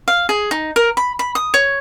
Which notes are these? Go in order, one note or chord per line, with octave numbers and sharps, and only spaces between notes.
F5
G#4
D#4
A#4
B5
B5
D#6
C#5